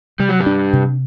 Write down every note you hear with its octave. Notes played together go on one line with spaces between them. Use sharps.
C3 G3
F#3
G2 G3
D4
C3